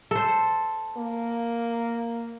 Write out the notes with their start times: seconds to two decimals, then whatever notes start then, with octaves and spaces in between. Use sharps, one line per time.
0.11 A4 C5
0.97 A#3